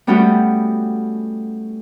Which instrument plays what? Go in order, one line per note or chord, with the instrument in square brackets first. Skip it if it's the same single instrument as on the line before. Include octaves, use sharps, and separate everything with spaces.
[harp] G3 A3 B3 C#4 F#4 G4